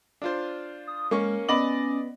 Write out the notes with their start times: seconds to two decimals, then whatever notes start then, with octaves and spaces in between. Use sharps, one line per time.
0.22 D4 F4 C5
0.87 D#6
1.11 G#3 A#3 C#4 C#6
1.49 B3 C#4 D5 D#5 B5 D6 F#7